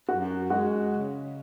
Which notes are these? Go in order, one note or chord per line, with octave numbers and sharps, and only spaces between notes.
F#2 F#4
G#3 F#4
C#3